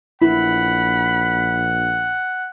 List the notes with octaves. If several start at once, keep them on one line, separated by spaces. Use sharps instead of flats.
A#1 E4 F#5 B5